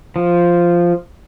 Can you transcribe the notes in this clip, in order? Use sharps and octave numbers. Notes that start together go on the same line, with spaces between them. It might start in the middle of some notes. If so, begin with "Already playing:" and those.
F3